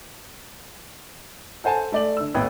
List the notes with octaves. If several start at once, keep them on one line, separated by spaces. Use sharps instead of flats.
A4 C5 F#5 G#5 A5
A3 D5 F#7
D3 E6
D#1 A1 B3 B4 G5 G#6